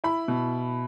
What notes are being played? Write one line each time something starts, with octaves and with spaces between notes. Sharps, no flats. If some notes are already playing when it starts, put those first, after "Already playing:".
E4 B5
B2